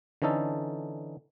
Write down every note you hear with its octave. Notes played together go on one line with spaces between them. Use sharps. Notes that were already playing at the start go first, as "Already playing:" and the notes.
D3 E3 C#4 D#4 A4